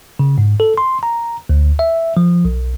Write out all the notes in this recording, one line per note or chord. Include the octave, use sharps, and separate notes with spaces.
C#3
G#2
A4
C6
A#5
D2
E5
F3
B1